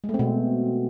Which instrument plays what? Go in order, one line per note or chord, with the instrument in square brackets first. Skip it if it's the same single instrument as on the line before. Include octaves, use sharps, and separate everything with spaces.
[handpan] G#3
A3
C4
B2